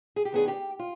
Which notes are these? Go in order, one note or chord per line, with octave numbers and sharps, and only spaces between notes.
G#4
G4
D#3 B3 D4 G#4
G4
F4